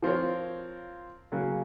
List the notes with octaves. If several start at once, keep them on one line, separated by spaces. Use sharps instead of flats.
F3 C4 F4 A#4 C#5
C#3 F#3 A#3